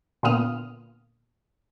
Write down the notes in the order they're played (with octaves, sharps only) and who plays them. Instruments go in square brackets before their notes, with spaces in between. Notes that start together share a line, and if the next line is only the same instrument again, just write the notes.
[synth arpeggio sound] A#2 D3 B3 F4 D#6 F6